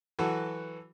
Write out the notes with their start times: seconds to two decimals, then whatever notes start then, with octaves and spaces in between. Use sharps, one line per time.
0.19 E3 F#3 F#4 A4